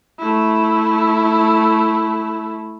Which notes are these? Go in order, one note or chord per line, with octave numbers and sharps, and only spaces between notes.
A3 E4